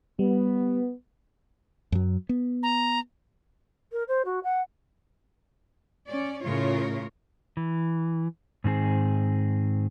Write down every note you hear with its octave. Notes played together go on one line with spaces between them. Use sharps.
G3 B3
F#2 F#3
B3
A#5
A#4
C5
F#4
F#5
C#4 D5
A2 C#3 F4 A#4 C#5
E3
G#2 D#3 C4 G#4